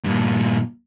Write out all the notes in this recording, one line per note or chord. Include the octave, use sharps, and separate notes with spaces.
G2 A#2